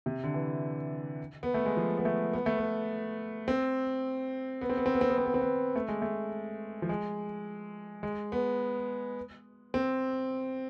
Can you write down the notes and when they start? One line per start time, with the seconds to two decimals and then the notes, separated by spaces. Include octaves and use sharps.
0.06 C3
0.24 D3
0.34 E3
1.43 B3
1.54 A3
1.65 G#3
1.77 F3
1.98 B3
2.05 A3
2.33 B3
2.46 A3
2.58 B3
3.48 C4
4.61 B3
4.70 C4
4.77 B3
4.86 C4
4.94 B3
5.01 C4
5.10 B3
5.18 C4
5.26 B3
5.34 C4
5.42 B3
5.76 A3
5.88 G#3
6.02 A3
6.82 F3
6.89 G#3
8.03 G#3
8.32 B3
9.74 C4